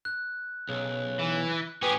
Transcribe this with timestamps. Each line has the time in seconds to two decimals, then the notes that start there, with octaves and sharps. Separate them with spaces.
0.05 F#6
0.69 B1 C#3
1.19 E3
1.82 A2 C#4 G4 G#4 B4